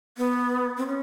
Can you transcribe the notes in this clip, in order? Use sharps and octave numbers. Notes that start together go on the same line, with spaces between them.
B3
C4
C#4